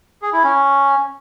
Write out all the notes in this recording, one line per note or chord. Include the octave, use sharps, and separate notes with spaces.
G#4
E4
C#4